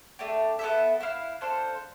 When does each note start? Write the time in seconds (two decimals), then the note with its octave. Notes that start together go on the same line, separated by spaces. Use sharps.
0.19 A3 D4 G4
0.59 B3 E4 A4 E5
1.00 E4 B4 F5
1.41 D4 A4 C5 F5